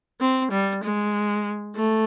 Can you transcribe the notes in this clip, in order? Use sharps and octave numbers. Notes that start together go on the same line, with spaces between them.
C4
G3
G#3
A3